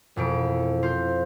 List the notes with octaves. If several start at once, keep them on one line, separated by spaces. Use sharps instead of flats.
E1 F2 B2 D7
F4 C5